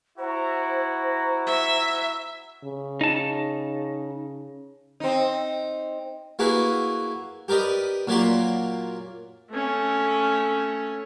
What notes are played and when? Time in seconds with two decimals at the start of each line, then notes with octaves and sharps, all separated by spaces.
0.19 E4 F#4 C5 A#5
1.47 E5
2.64 C#3
3.01 D#4 A5
5.00 C4 D#4
6.39 A#3 E4 F#4 G#4 B4
7.48 G4 A#4 B4 D5 D#5
8.07 A#2 F#3 A#3 D5 B5 C6
9.50 A3 C#4